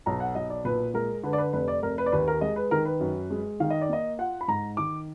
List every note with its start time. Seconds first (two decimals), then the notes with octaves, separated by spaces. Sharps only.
0.06 B1 A#5
0.20 F#5
0.35 B1 D#5
0.50 D5
0.65 A#2 B4
0.94 G#3 A#4
1.23 D3 B4
1.33 D5
1.38 B4
1.53 F1 B4
1.68 D5
1.82 F1 A#4
1.98 B4
2.06 D5
2.12 D#2 B4
2.28 A#4
2.41 G#3 D#5
2.56 B4
2.71 D#3 A#4
2.85 B4
3.00 F#2
3.30 G#3
3.60 D#3 F5
3.70 D#5
3.81 D5
3.89 A#3 D#5
4.18 F4 F#5
4.41 B5
4.48 G#2 A#5
4.77 D#3 D6